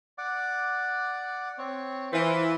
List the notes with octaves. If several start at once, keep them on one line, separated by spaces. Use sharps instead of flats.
D5 F#5 D6
C4 C#5
E3 F4 C5 B5 C6